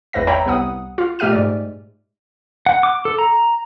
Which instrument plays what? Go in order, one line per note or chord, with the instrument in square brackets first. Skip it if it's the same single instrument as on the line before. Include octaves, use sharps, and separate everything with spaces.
[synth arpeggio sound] G#1 E2 B4 E5 A#6
C#5 E5 G5 A#5 B5
C2 B3 F#5 D#6
F4
A#2 A3 G4 E5 F6 D#7
G#2 D5
[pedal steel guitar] F#5
D6
A4
A#5